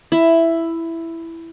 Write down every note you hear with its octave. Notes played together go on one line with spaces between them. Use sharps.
E4